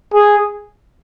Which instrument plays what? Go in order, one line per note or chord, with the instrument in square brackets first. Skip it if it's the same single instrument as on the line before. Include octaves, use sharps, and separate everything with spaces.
[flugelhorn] G#4